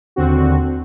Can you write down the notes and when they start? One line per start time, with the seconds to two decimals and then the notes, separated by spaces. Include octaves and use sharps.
0.16 D#2 D3 C4 F#4